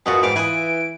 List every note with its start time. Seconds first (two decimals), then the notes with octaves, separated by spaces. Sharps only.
0.06 F#2 B2 G#3 F4 F#4 D#6
0.23 G#2 E3 G3 B3 F5 D7
0.36 E3 E4 F4 B4 G#5 D#6